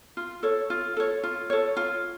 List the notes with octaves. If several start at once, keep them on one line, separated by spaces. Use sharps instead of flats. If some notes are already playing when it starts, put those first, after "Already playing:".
F4
A4 C#5
F4
A4 C#5
F4
A4 C#5
F4